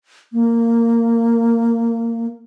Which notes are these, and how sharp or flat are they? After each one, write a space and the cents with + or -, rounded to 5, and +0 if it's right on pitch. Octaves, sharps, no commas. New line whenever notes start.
A#3 -15